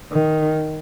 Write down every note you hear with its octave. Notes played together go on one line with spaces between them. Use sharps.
D#3